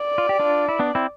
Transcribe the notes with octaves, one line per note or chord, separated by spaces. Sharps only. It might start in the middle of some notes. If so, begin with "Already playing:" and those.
Already playing: D5
F4
G4
D4 F4
E4
B3 D4
C4 E4